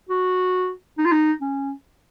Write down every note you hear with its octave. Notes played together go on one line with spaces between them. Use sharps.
F#4
D#4
F4
D#4
C#4